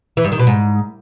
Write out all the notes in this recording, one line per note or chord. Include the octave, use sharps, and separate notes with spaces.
E3
G2
D#3
B2
G#2